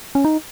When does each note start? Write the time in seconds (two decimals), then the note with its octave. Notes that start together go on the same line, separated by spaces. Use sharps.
0.15 C#4
0.25 D#4